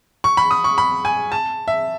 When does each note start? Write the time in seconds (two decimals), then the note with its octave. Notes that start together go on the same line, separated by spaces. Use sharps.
0.24 C#6
0.37 B5
0.51 D#6
0.64 C#6
0.78 B5
1.05 G#5
1.32 A5
1.68 E5